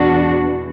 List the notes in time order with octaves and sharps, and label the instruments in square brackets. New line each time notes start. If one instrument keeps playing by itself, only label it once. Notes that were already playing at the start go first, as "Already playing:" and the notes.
Already playing: [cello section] E2 B2 D4 F#4